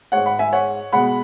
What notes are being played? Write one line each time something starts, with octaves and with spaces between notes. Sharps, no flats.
G#2 G#3 C#5 F#5
F#5 B5
E5 G#5
C#5 F#5
B2 G#3 F#5 B5